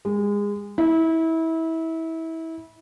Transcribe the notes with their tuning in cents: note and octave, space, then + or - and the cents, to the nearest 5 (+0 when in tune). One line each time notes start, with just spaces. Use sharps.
G#3 -25
E4 -25